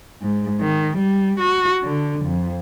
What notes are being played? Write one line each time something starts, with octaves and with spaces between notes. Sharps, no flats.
G#2
D#3
G3
F#4
D3
F2